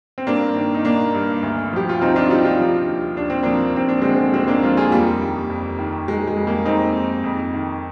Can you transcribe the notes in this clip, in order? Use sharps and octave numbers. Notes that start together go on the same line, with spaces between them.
C4
G2 A#3 D4
D#3
D#4
D#3 A#3 D4
G2
D2
F3 G4
F4
D2 C4 D#4
D4 F4
D2 D#4 G4
D4 F4
F3
D#2
D#2 D4
C4
F3 A#3 D4
D#2 C4
D4
D3 G#3 C4
D#2 G#3 C4
A#3 D4
F3 D4 F4
F4 G#4
F2 G3 A#3
D#3
F2
D#3
D#3 G#3
G#3
F2
G3 A#3
F2 C4 D#4
F2
F2
D#3